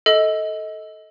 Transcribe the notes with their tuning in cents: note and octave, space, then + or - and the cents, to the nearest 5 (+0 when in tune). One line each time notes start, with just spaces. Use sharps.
A4 +0 D#5 +25